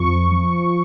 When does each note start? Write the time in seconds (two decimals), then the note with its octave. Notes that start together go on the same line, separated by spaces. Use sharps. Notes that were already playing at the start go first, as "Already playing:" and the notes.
Already playing: F2 F3 C#6
0.32 F3